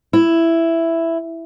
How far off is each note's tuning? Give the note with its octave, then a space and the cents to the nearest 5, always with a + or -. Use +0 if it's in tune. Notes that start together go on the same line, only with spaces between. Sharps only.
E4 +5